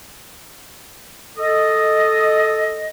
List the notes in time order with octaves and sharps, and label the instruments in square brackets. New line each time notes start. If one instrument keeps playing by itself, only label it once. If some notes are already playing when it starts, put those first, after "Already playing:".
[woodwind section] A4 D#5